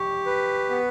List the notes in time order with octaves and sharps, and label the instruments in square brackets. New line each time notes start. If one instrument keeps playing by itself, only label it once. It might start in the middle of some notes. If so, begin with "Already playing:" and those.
Already playing: [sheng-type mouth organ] G4 [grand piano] C#6
[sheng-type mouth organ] B4
B3